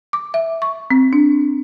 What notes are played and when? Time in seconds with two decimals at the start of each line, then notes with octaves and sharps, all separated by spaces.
0.13 D6
0.34 E5
0.62 C#6
0.91 C4
1.13 D4